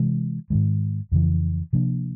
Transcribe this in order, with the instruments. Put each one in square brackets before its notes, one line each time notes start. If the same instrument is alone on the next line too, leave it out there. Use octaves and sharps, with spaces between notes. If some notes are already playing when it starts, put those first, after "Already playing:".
Already playing: [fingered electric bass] C3 E3 G#3
G#2 D#3 G#3
F2 C#3 E3
C3 F3 A#3 D4